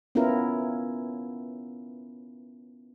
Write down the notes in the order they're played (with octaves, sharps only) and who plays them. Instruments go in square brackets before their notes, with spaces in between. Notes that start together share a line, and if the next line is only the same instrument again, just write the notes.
[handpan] B3 C#4 E4 F4 A#4